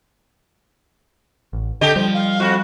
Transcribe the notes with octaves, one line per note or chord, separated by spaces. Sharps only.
A1
D3 D4 G4 A4 D#5
F3 G3
F5
F2 F#4